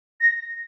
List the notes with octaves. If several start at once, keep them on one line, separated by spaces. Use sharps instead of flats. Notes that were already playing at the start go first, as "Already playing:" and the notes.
A#6